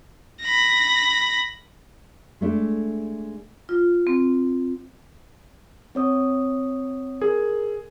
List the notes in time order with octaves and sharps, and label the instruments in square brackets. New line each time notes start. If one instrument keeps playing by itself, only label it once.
[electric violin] B5 A#6
[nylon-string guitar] G#3 A3 D4
[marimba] F4
C4
[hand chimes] C4 C#5 D#6
[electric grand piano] G#4 [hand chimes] A#4